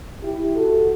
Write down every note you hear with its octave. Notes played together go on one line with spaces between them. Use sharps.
E4 G4
F#4 A4